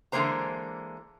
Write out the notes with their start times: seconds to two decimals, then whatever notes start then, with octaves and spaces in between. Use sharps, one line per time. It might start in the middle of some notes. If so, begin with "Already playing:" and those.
0.12 D3 E3 G#3 A#3 C5 A#5